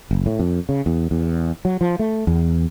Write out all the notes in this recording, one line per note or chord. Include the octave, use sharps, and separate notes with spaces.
F#1
A2
F2
C#3
E2
E2
F#3
F3
A3
E2